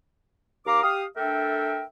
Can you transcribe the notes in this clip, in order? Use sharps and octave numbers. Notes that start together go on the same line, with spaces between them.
D#2 F5 A#5 D6
G4 F5 D#6
A3 D4 A4 A#4 E5 G5